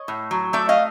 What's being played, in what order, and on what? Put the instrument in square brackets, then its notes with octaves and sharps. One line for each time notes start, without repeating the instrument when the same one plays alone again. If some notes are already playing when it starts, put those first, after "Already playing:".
Already playing: [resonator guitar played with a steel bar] C#5 D#5
A2
F#3
A3 D5 E5
D#5 F5